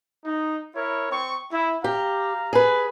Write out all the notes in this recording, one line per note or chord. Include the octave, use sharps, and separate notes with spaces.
D#4
E4 A#4 C#5
C4 C#6
E4
G4 F5 A#5
G#4 B4